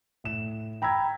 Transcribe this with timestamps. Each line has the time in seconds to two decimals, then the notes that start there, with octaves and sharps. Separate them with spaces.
0.24 A2 E7
0.82 G5 A#5 B5 E6 G#6